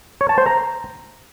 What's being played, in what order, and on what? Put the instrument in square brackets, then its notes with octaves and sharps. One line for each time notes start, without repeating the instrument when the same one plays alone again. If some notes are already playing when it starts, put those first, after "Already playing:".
[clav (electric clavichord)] C#5
A5
C5
A#5